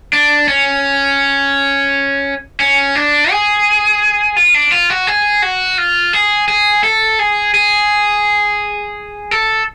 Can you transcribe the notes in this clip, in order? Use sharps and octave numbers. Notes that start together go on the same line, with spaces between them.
D4
C#4
C#4
D4
G#4
F4
D4
F4
F#4
G#4
F#4
F4
G#4
G#4
A4
G#4
G#4
A4